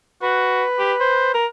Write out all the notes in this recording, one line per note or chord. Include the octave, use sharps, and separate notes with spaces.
F#4 B4
G4
C5
A#4